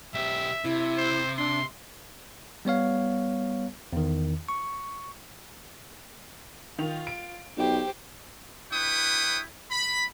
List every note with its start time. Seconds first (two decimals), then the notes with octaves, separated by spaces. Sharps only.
0.14 B1 G4 E5
0.64 C3 E4
0.97 C5
1.38 D4 C6
2.65 G3 B3 C#5 F5
3.93 E2 D#3
4.49 C#6
6.78 D#3 F4 F7
7.07 D7
7.57 B1 G4 C5 G5
8.72 D4 E4 B4 G5 C#6 D#6
9.71 B5